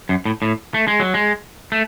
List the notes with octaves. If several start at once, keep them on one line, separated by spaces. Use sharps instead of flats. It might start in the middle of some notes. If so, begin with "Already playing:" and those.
F#2
A2
A2
A3
G#3
F#3
G#3
A3